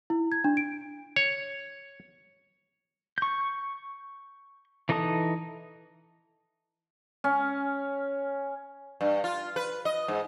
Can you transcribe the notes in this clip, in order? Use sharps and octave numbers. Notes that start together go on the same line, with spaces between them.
E4
G#6
D4
D7
C#5
C#6 G6
E3 D#4 A4 A5 D#6
C#4
G2
F4
B4
D#5
G#2